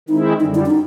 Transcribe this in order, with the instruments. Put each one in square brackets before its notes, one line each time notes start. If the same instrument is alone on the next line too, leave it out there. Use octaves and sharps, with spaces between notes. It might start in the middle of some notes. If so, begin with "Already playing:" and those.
[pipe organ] D#3 G#3 C4 E4 [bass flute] D#4
[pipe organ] F#2 D3 G3 [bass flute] D#4
[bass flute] E4
D4
D#4